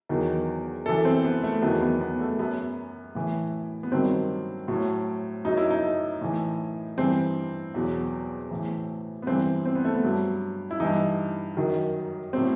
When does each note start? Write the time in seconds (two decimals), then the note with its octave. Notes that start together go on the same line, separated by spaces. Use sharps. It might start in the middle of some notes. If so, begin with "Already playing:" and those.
0.09 E2 D#3 F#3
0.86 F#2 E3 A4
1.05 C4
1.24 B3
1.43 A3
1.62 E2 D#3 F#3 B3
1.81 B3
2.01 B3
2.20 A3
2.39 F#2 F#3 B3
3.15 A2 E3
3.83 B3
3.92 G2 D#3 F#3 C4
4.68 A2 F#3
5.45 F#2 F#3 D#4
5.57 E4
5.70 D#4
6.21 A2 E3
6.98 G2 E3 C4
7.74 E2 B2 F#3
8.51 A2 E3
9.22 B3
9.27 G2 E3 C4
9.65 C4
9.75 B3
9.84 A3
9.94 B3
10.04 G2 F#3
10.71 E4
10.80 G2 E3 D#4
11.57 F#2 D#3 F#3
12.33 A2 F#3 C4